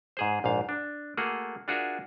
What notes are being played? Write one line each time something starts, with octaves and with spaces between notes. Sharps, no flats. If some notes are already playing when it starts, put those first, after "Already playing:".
G#2 G#4 C5
A#1 G#2 F5
D4
A3 A#3 F#4 G#4
D4 F4 F#4 G#4 A#4 E5